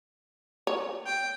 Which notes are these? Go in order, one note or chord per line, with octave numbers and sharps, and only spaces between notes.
C#5
G5